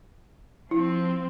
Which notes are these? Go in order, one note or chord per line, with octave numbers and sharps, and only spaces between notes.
F3 C4 E4